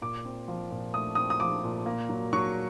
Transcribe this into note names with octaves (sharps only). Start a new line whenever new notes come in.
A#2 D6
C4
F3
A#2
A3 D#6
C4 D#6
D#6
F3 D6
A#2
A#3
F#3
F#3 C#6